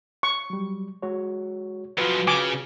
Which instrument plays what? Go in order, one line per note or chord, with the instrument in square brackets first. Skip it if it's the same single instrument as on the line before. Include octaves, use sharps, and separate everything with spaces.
[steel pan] C#6
[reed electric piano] F#3 G3
G#3 F#4 C#5
[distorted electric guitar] F#2 F3 [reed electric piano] F4 F#4 B4
[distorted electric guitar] C#3 [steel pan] G#5 D6